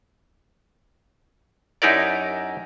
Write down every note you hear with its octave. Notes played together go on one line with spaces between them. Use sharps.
F#2 D#4 E4 G4 A#4 D5